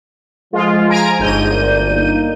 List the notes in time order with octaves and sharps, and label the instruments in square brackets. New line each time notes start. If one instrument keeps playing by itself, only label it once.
[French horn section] F3 [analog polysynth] G#3 F4
[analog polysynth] G#5 A#5 D7
[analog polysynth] G1 G6 D#7 [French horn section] G#2
[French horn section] D2 A#4 D5
A#3 D#4